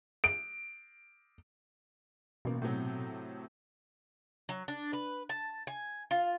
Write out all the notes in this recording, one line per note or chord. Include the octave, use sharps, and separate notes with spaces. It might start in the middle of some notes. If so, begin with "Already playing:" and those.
D7
A1 B2 A#3
A2 C3 F#3
F#3
D4
B4
A5
G#5
F4